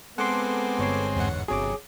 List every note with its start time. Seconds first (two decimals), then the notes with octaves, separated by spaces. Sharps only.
0.18 G#3 B3 C4 A4 F#5 C6 D6
0.79 G1 C#5 C7
1.16 E2 G#2 F#5
1.48 G1 C3 F#3 G#4 C#5 D6